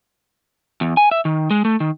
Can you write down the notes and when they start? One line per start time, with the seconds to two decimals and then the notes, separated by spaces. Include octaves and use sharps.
0.81 E2
0.97 G#5
1.11 E5
1.25 D#3
1.51 G#3
1.65 A3
1.80 D#3